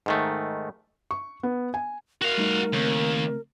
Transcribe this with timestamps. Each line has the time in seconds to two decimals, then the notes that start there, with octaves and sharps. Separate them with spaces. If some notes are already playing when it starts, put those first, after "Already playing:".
0.06 G#2 D#3 A3
1.11 C#6
1.43 B3
1.74 G#5
2.22 F#4 A#4 F5
2.38 G3 A3 D#4
2.74 D#2 C#3 A3 C4